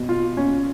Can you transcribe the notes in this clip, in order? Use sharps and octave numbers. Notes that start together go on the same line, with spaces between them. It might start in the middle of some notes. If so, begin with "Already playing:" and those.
Already playing: B2
F4
C#4